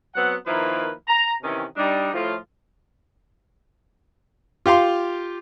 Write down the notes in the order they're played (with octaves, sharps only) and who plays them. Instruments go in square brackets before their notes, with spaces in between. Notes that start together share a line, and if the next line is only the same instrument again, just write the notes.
[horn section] F#3 B3 C4 F#5
D#3 F3 A#3 E4 A#4 B4
A#5
C3 D#3 E3 C#4
G3 D4 D#4
A2 F3 F4
[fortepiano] F4 G4 F5 C6